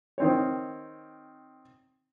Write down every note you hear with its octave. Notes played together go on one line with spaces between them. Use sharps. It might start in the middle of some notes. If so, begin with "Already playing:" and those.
D#3 C4 C#5